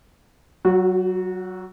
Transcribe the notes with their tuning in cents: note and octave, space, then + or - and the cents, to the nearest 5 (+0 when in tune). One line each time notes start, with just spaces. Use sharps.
F#3 +25 F#4 -20